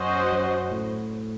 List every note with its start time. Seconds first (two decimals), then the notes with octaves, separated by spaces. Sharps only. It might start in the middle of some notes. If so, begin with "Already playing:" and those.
Already playing: F#2 C#4 F#4 C5 D#5
0.32 F#2
0.71 A2